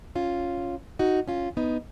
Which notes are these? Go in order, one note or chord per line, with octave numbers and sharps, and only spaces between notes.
C#4 F4
D#4 F#4
C#4 F4
B3 D#4